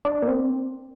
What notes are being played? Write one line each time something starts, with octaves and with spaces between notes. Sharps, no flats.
D4
A#3
C4